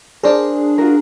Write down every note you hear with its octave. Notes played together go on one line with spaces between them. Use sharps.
D4 G#4 A#4 C5 D5
F4 F#4 A#4